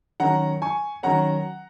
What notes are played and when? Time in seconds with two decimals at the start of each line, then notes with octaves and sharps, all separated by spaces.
0.20 D#3 F#3 C#4 F#5 A#5
0.62 G#5 C#6
1.03 D#3 F#3 C#4 F#5 A#5